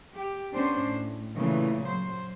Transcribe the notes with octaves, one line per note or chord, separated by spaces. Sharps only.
G4
B3 C#4 D4 C5
A2
A#2 C#3 E3 A3
F#3 C5